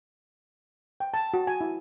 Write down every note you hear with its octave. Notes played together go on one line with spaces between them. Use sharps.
G5
A5
F#4
G#5
E4